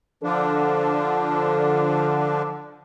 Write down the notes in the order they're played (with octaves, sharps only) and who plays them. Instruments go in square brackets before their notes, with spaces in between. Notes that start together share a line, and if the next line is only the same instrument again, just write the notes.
[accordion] D3 F3 D4 [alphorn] A4